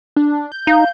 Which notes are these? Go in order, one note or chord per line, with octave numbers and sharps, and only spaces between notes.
D4
G6
D#4 F5